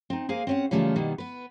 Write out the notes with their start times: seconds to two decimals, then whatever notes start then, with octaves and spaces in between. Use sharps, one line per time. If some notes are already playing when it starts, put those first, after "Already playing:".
0.10 C4 D#4
0.29 A#3 G#4 A#4 C5 F5 G#5
0.47 C4 C#4 F#5
0.71 C#3 E3 G3 A3 A#3 F4
0.96 B2 D#3 G3 A#3
1.18 B3 B4